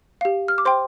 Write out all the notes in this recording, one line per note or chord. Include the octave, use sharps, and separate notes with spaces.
G4 F5
F6
D6
C5 G5 C6